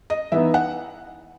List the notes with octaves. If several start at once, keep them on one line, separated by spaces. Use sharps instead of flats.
D#5
E3 B3 D#4 E5
F#5